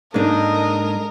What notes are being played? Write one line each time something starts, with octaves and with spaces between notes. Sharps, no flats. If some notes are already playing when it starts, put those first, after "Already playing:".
G#2 G#3 A#3 D4 D#4 A4 A#4 D#5